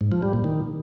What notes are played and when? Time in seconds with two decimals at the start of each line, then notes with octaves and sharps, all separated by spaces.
0.01 G#2
0.12 F3
0.22 G3
0.33 A#2
0.44 D#3